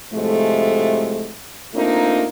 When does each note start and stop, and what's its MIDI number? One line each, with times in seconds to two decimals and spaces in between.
0.13 1.34 45
0.13 1.34 48
0.13 1.34 53
0.13 1.34 56
0.13 1.34 57
1.75 2.26 57
1.75 2.26 58
1.75 2.26 60
1.75 2.26 62
1.75 2.26 63
1.75 2.26 65